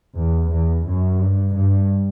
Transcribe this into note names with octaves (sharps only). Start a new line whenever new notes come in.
E2
E2
F#2
G2
G2